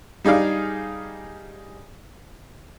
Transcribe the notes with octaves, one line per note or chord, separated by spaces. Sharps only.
G3 D#4 G#4 D5 F5